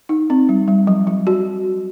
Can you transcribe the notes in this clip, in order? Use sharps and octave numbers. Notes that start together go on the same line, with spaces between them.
D#4
C4
G3
G3
F#3
F#3
F#4